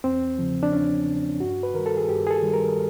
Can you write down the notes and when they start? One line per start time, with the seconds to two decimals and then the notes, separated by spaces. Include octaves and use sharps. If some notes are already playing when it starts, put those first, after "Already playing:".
0.04 E2 C4
0.38 C#3 F3
0.63 D4
0.73 E2 C#4
1.06 C#3 F3
1.40 G2 F#4
1.63 B4
1.74 D#3 G3 A#4
1.86 A4
1.97 G#4
2.08 G2 G4
2.27 G#4
2.31 A4
2.42 D#3 G3
2.53 A#4